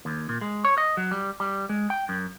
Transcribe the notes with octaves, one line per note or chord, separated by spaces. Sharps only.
D#2
A#2
G#3
C#5
D#5
F#3
G3
G3
G#3
G5
F#2